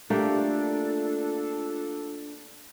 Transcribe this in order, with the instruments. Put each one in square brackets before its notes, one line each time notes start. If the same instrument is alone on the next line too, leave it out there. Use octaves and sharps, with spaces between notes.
[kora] A3 A#3 G4 [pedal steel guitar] D4 [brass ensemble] F4 A4